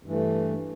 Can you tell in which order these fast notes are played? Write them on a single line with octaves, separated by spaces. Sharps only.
G2 E3 A3